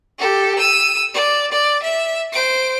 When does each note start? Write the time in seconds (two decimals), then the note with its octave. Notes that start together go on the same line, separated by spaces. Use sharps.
0.19 G4 A4
0.59 E6 D#7
1.14 D5
1.52 D5
1.83 E5
2.32 C5 D7